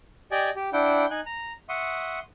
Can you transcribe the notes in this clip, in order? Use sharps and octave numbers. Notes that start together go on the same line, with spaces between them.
G4 D5 D#5 G5 G#5
G4
D4 E4 F#5 G5 G6
D#4 G#5 F#6
A#5
E5 F#5 C6 C#6 D#6